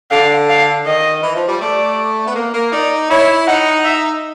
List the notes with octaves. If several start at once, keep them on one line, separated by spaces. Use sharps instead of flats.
D3 F5
F5
D#3 D#5
E3
F3
G3
A3 D5
B3
A#3
A#3
D#4 D5
E4 C#5
D#4 F#5
E5